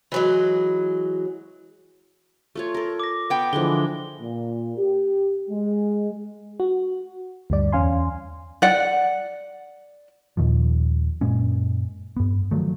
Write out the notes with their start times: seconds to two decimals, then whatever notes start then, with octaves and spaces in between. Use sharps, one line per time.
0.12 E3 F#3 G#3
2.55 A3 F4 C#5
2.74 A4 A#4
3.00 D6 A#6
3.30 B3 G5
3.53 D3 E3 F3 G#3 D4 G7
4.20 A#2
4.78 G4
5.50 G#3
6.60 F#4
7.50 D2 G2 G3 D5
7.72 E2 C#4 F5 G#5 C6
8.62 D5 F#5
10.37 D#2 A#2 D#3 F3
11.21 F#2 A#2 G#3 C#4
12.17 G2 B3
12.51 D#3 F3 F#3 A3